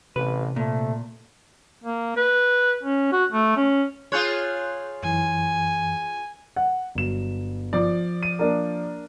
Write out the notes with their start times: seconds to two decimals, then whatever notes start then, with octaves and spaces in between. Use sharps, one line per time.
0.16 A1 C3 B4
0.56 A#2 A3
1.84 A#3
2.16 B4
2.83 C#4
3.12 F#4
3.32 A3
3.56 C#4
4.12 F4 G#4 C#5 C6 F#6 G6
5.03 F#2 E3 G#5
6.56 F#5
6.95 G1 F#3 E7
7.73 F3 D5
8.23 D#7
8.39 A#3 D4 A#4